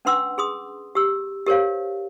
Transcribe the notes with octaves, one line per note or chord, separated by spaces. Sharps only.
C#4 D4 B4 F#5 C6 E6
G#4 C6 D#6
G4 E6
G4 A#4 C5 C#5 F5